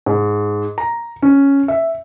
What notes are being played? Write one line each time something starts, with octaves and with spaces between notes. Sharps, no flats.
G#2
A#5
C#4
E5